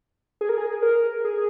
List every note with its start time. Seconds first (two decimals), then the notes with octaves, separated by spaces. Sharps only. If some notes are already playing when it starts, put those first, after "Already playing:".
0.41 G#4
0.49 A#4
0.58 G#4
0.82 A#4
1.24 G#4